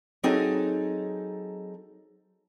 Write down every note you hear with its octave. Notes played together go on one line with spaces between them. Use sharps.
F#3 C4 D#4 G#4 A4